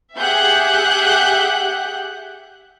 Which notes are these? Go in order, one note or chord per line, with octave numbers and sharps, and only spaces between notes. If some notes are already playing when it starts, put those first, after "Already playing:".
G4 G#4 E5 F#5 F#6 G6